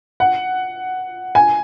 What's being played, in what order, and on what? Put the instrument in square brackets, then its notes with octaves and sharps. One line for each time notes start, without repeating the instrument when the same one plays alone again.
[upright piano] F#5
G#5